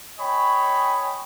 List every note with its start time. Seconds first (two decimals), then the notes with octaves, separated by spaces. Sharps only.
0.20 C#5 D#5 G5 G#5 B5